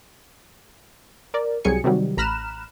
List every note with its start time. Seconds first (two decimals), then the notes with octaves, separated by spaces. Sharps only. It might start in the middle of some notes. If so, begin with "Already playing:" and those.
1.34 A#4 D5
1.65 C2 F#3 G3 G#4 G#5 C#7
1.84 C3 D#3 F#3 G3
2.17 A1 A#5 B5 F6 F#6 E7